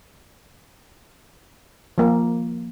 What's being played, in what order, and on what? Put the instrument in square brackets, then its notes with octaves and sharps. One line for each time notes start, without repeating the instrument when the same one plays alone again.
[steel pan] F3 A#3